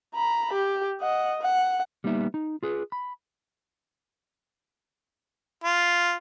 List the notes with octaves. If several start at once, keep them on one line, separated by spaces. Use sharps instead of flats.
A#5 B5
G4
D#5 F#5
F#5
G3 A#3 B3 D#4 E5
D#4
F4 G#4 B4
B5
F4